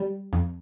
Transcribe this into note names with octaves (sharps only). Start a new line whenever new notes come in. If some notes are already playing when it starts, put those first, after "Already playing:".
Already playing: G3
F2